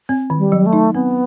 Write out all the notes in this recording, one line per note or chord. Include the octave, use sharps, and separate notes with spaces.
C4
D#3
G3
F#3
A3
D#4
B3 C4